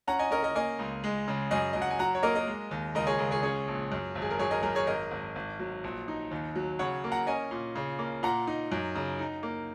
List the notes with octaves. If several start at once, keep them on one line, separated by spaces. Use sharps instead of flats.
C#4 F#5 A#5
D#5 G#5
C#4 A#4 D#5
A#4 D#5
A#3 D#5 G#5
C#2
G#3
C#3
F#2 D#5 G#5
F#2 D#5
F#5
G#5
F#3 F#5 A#5
C#5
A#3 A#4 D#5
A#4 D#5
G#3
D#2
C#2 A#4 D#5
G#4 C#5
C#2 A#4
G#4 C#5
C#4 G#4 C#5
A#1
F#2
G#1
G#4
A#4
F#2 G#4 C#5
A#4 D#5
F#2 A#4
G#4 C#5
G#1 A#4 D#5
G#1
G#1
F#3
A#1
D#4
D#2
F#3
C#3 C#5 F#5
A#3
F#5 A#5
C#4 D#5 G#5
A#2
C#3
A#3
A#2 F#5 A#5
D#4
F#2
C#3
D#4
A#3